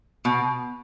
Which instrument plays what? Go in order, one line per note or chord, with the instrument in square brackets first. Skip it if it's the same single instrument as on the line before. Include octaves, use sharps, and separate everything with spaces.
[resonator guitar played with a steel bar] B2